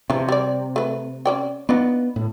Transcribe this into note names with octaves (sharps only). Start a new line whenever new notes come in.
C3 E3 F3
G3 D5
A3 B4
C#4 D5 G5
B3 D4 D#4 F4
A2